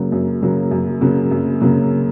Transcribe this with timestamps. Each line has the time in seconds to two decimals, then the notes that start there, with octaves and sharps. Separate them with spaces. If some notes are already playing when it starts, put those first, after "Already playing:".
Already playing: F#2 C#3 F#3 A#3
0.12 F#2
0.42 C#3 F#3 A#3
0.71 F#2
1.01 C#3 F#3 A#3
1.31 F#2
1.61 C#3 F#3 A#3